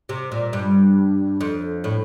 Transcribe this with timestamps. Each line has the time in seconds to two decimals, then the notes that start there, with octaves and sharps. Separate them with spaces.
0.09 C3
0.32 A#2
0.53 G2
1.41 F2
1.84 A2